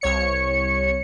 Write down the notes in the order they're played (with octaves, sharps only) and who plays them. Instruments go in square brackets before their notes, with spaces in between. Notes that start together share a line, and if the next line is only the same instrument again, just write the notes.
[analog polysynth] C2 C#5 C#7